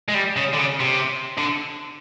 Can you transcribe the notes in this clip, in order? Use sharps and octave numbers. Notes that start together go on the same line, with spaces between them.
G#3
G3
C#3
D3
C#3
C3
D3